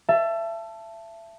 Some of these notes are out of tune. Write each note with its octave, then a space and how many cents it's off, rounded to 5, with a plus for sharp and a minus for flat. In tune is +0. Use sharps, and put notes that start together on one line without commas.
E5 +30 A5 +0